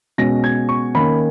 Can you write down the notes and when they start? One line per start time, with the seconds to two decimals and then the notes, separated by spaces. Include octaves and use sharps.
0.18 B2 G#3 C#4 A#6
0.44 G#6
0.69 C#6
0.95 D#3 A#3 C#4 B5